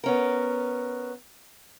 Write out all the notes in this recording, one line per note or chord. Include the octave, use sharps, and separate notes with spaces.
B3 C#4 A#4